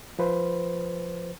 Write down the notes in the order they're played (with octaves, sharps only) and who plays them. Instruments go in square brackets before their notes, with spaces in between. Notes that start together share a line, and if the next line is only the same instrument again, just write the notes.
[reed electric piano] F3 B4 C5